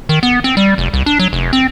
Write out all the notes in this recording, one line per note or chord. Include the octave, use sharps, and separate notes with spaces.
D#3
B3
C4
G3
F1
C2
D4
F#3
F1
C4